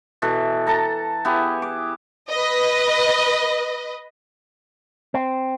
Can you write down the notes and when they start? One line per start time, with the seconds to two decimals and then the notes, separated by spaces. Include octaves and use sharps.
0.22 B2 E3 A4
0.67 A4 A5 A#5
1.25 B3 E4 G4 G#4
1.62 D6
2.29 B4 D#5
5.14 C4